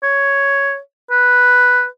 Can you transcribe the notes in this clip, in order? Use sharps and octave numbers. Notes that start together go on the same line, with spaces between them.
C#5
B4